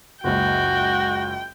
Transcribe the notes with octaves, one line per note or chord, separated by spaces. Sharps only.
F#1 C#2 F#4 G5